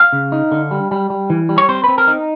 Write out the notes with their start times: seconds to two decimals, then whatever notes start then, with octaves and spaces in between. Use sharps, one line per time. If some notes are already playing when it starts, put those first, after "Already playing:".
Already playing: F5
0.13 C#3
0.32 D#4
0.52 D3
0.71 G3
0.91 G3
1.10 G3
1.30 E3
1.49 G3
1.58 C#5
1.69 C4 C5
1.84 C4 B4
1.98 A#4
2.07 D#4